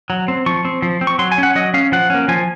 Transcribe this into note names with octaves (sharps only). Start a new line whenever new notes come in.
F#3
C4
F3 C#6
C4
F3
C4
C#6
F#3 C6
G#5
C#4 F#5
F#3 D#5
C#4 F5
F3 F#5
A#3 C#4
F3 G#5